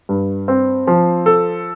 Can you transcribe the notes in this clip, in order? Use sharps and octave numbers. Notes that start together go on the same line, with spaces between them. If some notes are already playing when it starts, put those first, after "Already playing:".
G2
C4
F3
A4